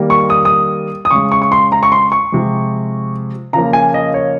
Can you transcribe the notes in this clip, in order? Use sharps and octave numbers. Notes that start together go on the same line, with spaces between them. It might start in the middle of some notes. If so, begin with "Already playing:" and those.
Already playing: D#3 G3 A#3
C#6
D#6
D#6
D#6
C#3 G#3 C#6
C#6
C#6
C6
A#5
C#6
C6
C#6
C3 F3 G#3
C#3 F3 A#3 A#5
G#5
D#5
C#5